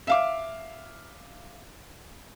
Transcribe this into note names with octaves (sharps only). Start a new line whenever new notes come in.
E5 F5 D6